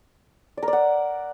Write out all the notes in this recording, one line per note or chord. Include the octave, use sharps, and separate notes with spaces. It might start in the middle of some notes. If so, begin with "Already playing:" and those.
D5
A#4
D5
F#5